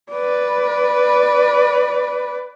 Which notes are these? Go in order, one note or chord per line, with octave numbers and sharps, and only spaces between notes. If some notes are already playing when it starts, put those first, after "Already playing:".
B4 D5